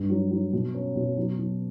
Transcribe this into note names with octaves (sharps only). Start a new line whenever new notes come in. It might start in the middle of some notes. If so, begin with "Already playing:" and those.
Already playing: G2
F#3
F#3
B2
C#4
B2
F#3
F#3